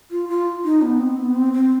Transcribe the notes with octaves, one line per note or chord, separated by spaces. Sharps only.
F4
F4
D#4
B3
C4
B3
C4
C4